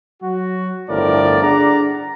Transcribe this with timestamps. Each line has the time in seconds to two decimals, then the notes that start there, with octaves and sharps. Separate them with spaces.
0.23 F#3 F#4
0.89 G1 A2 F3 A#4 D5
1.43 D4 G#4 D5 F#5 A#5